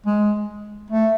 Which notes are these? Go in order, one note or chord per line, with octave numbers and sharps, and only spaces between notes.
G#3
A3